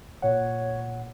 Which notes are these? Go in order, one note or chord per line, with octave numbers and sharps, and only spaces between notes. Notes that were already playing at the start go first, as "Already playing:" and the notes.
A#2 C#5 F#5